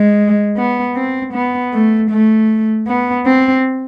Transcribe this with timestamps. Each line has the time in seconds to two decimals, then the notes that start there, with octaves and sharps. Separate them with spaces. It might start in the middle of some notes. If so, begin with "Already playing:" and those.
Already playing: G#3
0.57 B3
0.96 C4
1.34 B3
1.73 A3
2.10 A3
2.87 B3
3.26 C4